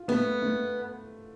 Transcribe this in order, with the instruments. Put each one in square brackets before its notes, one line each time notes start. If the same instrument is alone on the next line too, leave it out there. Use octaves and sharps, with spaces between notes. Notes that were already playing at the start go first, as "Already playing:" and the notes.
Already playing: [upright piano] F4
[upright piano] A3 [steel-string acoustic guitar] B3
[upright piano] A3